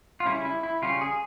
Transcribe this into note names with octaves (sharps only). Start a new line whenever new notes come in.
F4
C#3 G3 C#4 E4
E4
E4
C#3 G3 C#4 F4
G#4